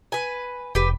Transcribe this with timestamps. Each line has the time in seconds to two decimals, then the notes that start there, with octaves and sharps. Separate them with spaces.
0.12 B4 G#5
0.75 F1 G4 B4